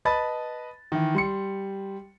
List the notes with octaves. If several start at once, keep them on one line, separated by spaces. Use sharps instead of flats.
B4 D#5 A5 B5 A6
D#3 E3
G3 C6 C#7